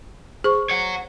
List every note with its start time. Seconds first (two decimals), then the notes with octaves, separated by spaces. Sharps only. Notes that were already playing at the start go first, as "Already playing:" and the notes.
0.44 G#4 C5 C#6
0.70 C#5 F#5